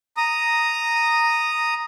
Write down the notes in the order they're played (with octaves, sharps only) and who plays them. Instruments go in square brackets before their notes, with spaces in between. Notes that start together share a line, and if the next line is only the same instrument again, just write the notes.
[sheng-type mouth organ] A#5 D#6